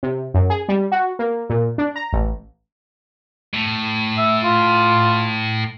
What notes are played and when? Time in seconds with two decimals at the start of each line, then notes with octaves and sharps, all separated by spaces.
0.03 C3
0.34 F#2
0.50 G#4
0.69 G3
0.92 F#4
1.19 A#3
1.49 A#2
1.78 D4
1.96 A#5
2.13 A1
3.54 A2
4.18 E5
4.44 F4